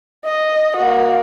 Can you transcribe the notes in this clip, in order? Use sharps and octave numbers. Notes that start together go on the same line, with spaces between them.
D#5
A#3 F#4